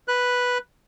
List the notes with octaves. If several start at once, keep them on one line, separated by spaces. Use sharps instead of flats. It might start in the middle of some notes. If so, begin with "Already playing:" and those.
B4 F#6